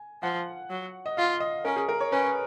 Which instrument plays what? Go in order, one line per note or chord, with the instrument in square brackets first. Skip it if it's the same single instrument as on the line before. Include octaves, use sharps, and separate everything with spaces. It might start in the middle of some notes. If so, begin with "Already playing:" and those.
Already playing: [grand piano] G#5
[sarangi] F3 [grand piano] F#5
[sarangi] F#3
[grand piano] D#5
[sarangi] F4 [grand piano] F5
[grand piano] D#5
[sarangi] C#4 [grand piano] A#4
[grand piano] G#4
A#4
C#5
[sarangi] C#4 [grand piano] B4